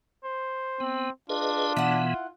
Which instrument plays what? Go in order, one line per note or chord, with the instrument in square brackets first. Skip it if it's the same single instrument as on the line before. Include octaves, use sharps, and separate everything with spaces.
[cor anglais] C5
[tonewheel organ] B3 [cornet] C4
[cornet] D4 [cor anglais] F4 [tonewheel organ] G#4 B4 D#5
[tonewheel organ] B2 E3 B3 [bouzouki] E4 F#5